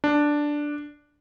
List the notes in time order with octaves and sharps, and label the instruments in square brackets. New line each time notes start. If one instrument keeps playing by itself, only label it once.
[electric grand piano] D4